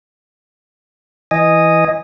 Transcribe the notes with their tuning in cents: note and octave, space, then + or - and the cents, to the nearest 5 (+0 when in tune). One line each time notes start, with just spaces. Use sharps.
E3 +0 D#5 +0 G#5 -10